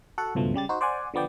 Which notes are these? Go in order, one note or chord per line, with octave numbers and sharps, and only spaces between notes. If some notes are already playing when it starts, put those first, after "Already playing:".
F#4 A4 F#5
C#2 G2 B2 F3 A3
C#3 G3 G4 A6
D#4 F#4 C5
C5 D5 F#5 G#5
D3 F3 B3 D5 G5